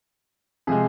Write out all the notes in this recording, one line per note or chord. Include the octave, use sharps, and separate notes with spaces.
C3 F3 G#3 G#4